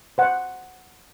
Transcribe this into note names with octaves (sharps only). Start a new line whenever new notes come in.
C5 F#5